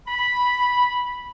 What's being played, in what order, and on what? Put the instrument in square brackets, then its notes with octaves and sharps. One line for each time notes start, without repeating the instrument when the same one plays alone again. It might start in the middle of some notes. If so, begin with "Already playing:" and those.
[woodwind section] B5